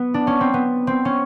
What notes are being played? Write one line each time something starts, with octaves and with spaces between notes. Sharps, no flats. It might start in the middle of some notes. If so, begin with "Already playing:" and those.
Already playing: B3
D4
C#4
C4
B3
C4
C#4